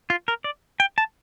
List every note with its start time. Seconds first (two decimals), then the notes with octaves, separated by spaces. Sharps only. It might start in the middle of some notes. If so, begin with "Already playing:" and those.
0.10 F4
0.28 A#4
0.44 D5
0.80 G5
0.98 A5